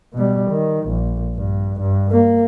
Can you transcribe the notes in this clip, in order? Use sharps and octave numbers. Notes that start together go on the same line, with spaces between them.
B2 G3
D#3
A#1
G2
G2
A#3